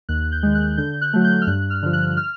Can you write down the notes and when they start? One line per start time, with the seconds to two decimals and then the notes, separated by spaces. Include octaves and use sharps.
0.09 D#2 F#6
0.32 G6
0.43 D#3 G#3
0.55 F#6
0.77 D3 G6
1.01 F#6
1.13 F#3 A3
1.24 G6
1.42 F6
1.47 G2 F#6
1.70 F6
1.82 D3 F3
1.93 F#6
2.17 F6